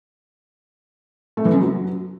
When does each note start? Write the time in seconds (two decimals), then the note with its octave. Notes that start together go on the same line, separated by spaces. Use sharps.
1.37 A3
1.45 E3
1.53 F#2
1.61 F#3